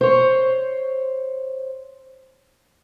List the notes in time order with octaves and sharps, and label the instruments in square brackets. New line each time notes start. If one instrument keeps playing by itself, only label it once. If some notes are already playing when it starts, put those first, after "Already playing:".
[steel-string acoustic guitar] C5 C#5